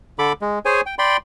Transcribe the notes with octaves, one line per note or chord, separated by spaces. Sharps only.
D3 A4 B5 D6
G#3
G#4 C5 C#5 G#5
G5
D5 G5 B5 C6